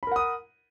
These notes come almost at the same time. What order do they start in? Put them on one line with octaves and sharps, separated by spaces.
B5 A#4 F#5 D#6